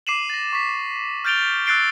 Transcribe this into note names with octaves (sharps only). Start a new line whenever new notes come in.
D6 C7 D#7 E7 F#7
A6 A#6
C#6 B6
F6 G6 A6 D7 F7 G7
E6 F#6 A6 C7 D7 G7